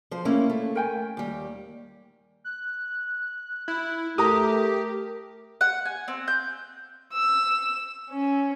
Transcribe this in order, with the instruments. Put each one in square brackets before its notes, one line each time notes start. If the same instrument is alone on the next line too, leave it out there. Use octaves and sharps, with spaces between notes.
[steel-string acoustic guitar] F3 C5
[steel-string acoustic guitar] A3 A#3 C#4 [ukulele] E4 F5
[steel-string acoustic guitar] A3
[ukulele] A#4 G5 G#5
[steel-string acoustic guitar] D#2 G3
[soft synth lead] F#6
[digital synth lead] E4
[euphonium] A3 [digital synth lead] G4 [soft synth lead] A#4 [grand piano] A#5 D#6
[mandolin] F#5
G#5
C4
G6
[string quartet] E6
C#4